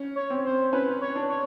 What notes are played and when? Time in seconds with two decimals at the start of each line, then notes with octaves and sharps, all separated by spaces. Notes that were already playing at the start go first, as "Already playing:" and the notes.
Already playing: C#4
0.16 C#5
0.30 C4
0.45 C5
0.73 C#4 B4
1.01 C#5
1.16 D4
1.29 C#5